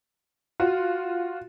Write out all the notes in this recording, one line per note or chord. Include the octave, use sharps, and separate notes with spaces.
F4 F#4